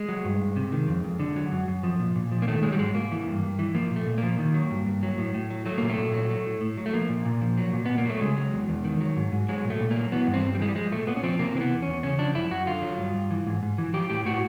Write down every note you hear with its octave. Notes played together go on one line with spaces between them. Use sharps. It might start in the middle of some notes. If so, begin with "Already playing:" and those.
Already playing: G#3
F#3
G2
G2
C3
D#3
F2
F2
D3
F#3
F#2
F#2
F3
A#2
A#2
F3
A#3
D#3 A3
F#3 G#3
G3
G#2 G#3
G#2 A#3
E3
G2
G2
E3
F3 A#3
A#2
A3
A#2
A#3
F3
D#3
F#3
G2
G2
F#3
A2
A2
F#3
F#3 A3
A#2 A#3
A3
A#2
F#3
F#3
A2
A2
F#3
A3
F3 A#3
A#2
A#2
F3
F#3
A#2
A#2 B3
A#3
F#3 A3
C#3 G#3
F#3
E2
E2
D#3
F#3
G#2
G#2
F#3 G#3
A#2
A3
A#2
A#3
F#3
E3 B3
G2
C4
G2
G3
E3 G#3
G3
F3 G#3
A#2 A3
A#2 B3
C#4
F3 C4
C3 A#3
E3 C4
B3
E2
E2 C#4
C#3 C#4
F3 D4
F#2 E4
F#2 F#4
D3 F4
F#3
G2
G2
E3
G#2
G#2
E3
F3 G4
A2 G4
A2 F#4